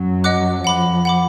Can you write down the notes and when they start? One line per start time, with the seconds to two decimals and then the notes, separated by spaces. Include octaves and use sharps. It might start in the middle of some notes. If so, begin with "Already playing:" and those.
Already playing: F#2 F#3
0.24 D#5 F#5 D6 F#6
0.64 F2 F3 F#5 B5 D6
1.05 F#5 B5 D6